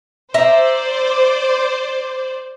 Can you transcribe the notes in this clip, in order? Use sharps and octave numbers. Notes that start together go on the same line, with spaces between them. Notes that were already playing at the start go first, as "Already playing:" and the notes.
C5 D5 E5 A#5